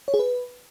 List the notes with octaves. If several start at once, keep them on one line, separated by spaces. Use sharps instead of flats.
C#5
G#4
B4